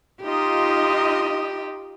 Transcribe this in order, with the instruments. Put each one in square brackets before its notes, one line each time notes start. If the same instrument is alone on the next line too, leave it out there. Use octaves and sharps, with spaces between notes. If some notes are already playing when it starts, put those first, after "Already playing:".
[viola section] D#4 F4 D#5 [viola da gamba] G4